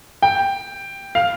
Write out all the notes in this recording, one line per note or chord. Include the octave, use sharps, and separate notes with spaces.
G5
F5